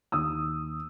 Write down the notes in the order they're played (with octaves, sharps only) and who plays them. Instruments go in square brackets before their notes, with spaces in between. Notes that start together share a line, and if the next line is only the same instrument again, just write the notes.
[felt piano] D#2 D#6 E6